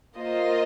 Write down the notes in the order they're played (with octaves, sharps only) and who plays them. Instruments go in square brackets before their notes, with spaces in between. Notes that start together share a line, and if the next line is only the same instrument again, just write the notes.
[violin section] A#3 F4 C5 D#5